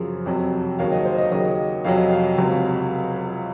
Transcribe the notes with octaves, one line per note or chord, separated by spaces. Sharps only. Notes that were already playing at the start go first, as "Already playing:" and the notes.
Already playing: F#2 C#3 F3
F2 C3 F#3
D#2 C#3 F#3 F5
D#5
C5
D#5
D#2 C#3 F#3 D#5
F2 C3 F#3 F5
D#5
F5
C#2 C3 F#3